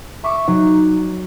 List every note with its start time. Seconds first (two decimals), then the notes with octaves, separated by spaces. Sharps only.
0.24 E5 C#6 D6
0.48 F#3 D#4